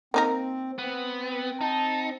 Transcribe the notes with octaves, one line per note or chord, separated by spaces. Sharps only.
A#3 C4 D#4 A#4
B3 C4
D#4 A5